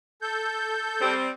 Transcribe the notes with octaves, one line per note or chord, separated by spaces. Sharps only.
A4 G6
G3 C4